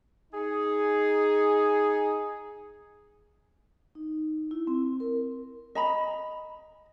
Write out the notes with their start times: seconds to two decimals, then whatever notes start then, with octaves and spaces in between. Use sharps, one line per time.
0.33 D#4 G#4
3.95 D#4
4.51 E4
4.67 C4
5.00 A#4
5.75 D#5 A#5 B5